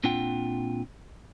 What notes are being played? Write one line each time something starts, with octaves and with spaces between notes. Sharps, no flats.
A#2 C4 D4 F4 F#5 G5